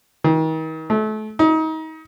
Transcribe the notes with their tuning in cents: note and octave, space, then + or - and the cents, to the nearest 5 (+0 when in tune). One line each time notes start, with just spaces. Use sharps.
D#3 +40
A3 -30
D#4 +30